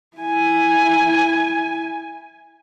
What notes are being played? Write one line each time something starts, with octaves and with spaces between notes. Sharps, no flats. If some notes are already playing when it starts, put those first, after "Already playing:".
E4 G#5